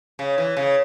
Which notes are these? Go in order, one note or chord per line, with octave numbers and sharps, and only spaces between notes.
C#3
E3
C#3